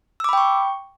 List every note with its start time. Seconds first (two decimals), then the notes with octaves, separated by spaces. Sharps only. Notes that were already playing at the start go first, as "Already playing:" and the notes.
0.20 E6
0.24 D6
0.29 B5
0.33 G5
0.37 C#6